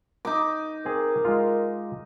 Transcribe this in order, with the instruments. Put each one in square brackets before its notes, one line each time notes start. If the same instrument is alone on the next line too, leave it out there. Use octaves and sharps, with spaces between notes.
[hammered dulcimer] D#4 D6
[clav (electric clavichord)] C4 G#4 [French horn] A#4
[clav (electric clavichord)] G#3 F4